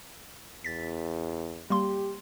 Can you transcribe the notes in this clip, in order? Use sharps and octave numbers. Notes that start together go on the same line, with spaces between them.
E2 A6 B6
G3 A#3 G4 C6